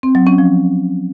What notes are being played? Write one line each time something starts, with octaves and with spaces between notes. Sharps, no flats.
C4
F#3
C#4
F3